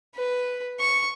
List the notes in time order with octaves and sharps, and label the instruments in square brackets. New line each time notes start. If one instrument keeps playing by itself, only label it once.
[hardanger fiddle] B4
C#6